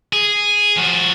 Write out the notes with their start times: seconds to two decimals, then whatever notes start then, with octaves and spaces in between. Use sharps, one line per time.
0.13 G#4
0.77 F3 F#4